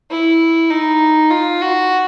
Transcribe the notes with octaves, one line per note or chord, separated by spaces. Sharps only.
E4
D#4
F4
F#4